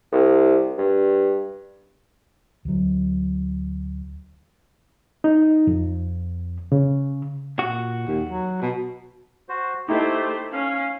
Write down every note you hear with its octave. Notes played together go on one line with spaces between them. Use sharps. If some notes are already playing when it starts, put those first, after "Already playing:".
C2
G2
D2 F#3
D#4
F2
C#3
A#2 F#4
D#2
F#3
B2
F#4 C5
A3 D#4 E4 G4 C5
C#4 F5